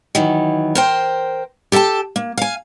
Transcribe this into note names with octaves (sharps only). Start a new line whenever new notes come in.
D#3 E3 F#3
A#4 C5 G5
G4 A4 F5 G5 A5
A#3
F5 G#5